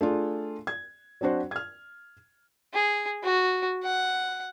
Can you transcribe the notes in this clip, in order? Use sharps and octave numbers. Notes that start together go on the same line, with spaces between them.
A3 D4 F4 G#4
G#6
F#3 C4 D4 F#4 C5
F6 G#6
G#4
F#4
F#5